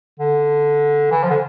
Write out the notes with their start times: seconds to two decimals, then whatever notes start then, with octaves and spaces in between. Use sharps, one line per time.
0.19 D3
1.11 E3
1.23 F3
1.30 D3